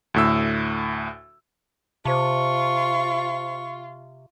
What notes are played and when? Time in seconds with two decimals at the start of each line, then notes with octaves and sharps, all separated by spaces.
0.14 D2 A2 E6
2.05 C3 F4 C5 A5 C#6